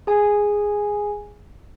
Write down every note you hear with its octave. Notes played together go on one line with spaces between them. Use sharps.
G#4 G#5